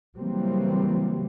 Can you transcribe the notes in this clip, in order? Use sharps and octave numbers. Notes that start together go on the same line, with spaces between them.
C#3 E3 F#3 G3 A#3 C4